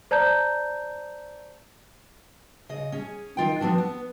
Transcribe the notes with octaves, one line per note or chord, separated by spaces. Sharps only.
C5 D5 A5 A#5 G6
C#3 D#5
C#4 G#4
D#3 F4 G5
F3 B3 C4 D4 F#4
B3